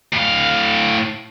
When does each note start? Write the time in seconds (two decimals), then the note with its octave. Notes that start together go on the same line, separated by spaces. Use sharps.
0.13 A2 F5